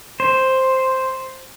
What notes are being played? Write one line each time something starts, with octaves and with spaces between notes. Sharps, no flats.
C5